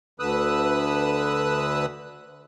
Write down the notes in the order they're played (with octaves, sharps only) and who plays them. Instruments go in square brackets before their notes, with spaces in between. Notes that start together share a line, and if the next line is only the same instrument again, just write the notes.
[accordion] D2 D3 B4 D#6 E6 F#6